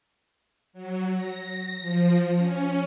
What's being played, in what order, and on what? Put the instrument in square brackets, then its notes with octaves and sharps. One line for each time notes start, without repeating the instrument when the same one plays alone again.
[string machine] F#3
A#6
F3
C#4